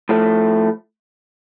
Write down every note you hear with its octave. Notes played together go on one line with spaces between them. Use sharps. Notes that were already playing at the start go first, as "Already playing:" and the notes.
A2 F3 A3